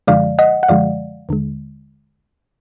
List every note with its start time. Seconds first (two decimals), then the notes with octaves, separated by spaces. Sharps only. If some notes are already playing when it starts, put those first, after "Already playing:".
0.07 F#2 D3 F3 G#3 D5 F5
0.39 D#5 F#5
0.63 F#5
0.68 F#2 D3 F3 G#3 D5 F5
1.29 D#2 D3 G#3